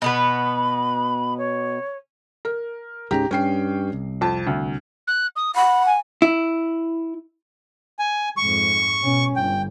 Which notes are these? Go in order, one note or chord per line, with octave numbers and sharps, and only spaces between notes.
B2 B3 B4 B5
C#5
A#4
C#2 G#2 C#3 G4 A#5
G2 C#4 G5 C7
C2
F2 A5
D2
F#6
D#6
F#5 B5
G#5
E4
G#5
F2 G#2 C#6
B2 C#4
G1 G5